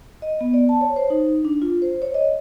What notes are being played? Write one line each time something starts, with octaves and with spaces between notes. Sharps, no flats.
D#5
B3
D5
A5
C#5
C5
D#4
D4
F4
C5
C#5
D#5